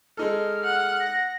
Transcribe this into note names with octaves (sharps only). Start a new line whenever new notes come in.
G#3 D#4 A4 F6
F#5
A#6